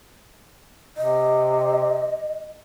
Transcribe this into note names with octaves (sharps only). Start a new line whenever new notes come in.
C3 D#5